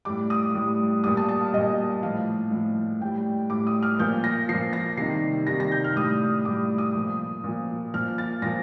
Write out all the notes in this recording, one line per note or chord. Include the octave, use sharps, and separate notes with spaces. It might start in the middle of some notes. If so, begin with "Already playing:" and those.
A2 G3 D6
D#6
A2 G3
A#2 G3 D#6
A5
A5
F5
A#2 G3 D#5
A2 F3 F5
A2 F3
A2 G3 G5
A2 G3 D6
D#6
F6
A#2 F3 G6
A#6
A#2 F3 C7
A#6
C3 D#3 G3 C7
C3 D#3 G3 A#6
A#6
G6
F6
A2 G3 D#6
A2 G3 D6
D#6
A#2 F3
A#2 F3
A#2 F3 F6
A6
A#2 F3 A#6